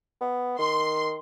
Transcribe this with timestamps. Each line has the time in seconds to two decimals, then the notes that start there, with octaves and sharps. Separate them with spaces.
0.21 B3
0.59 D#3 C6